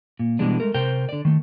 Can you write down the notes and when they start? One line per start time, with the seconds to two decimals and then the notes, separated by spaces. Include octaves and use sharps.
0.19 A#2
0.39 B2 E3 G3 G#3 D4
0.60 G#3 A3 A#4
0.74 C3 A#4 C5 G5
1.09 D3 D5
1.25 D#3 A3